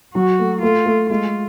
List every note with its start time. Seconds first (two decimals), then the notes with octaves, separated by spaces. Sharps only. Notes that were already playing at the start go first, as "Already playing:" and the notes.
0.15 F#3 F#4
0.39 A3
0.62 A3 F4
0.86 A3
1.10 G#3 F4